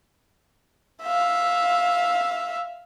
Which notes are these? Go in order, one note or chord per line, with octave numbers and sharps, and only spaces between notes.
E5 F5